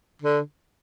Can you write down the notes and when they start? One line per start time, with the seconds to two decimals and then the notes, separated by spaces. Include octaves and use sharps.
0.22 D3